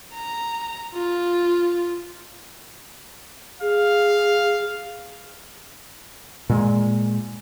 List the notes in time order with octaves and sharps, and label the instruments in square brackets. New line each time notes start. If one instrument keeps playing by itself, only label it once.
[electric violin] A#5
F4
[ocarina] G#4 [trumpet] F5
[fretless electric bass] A#2 G#3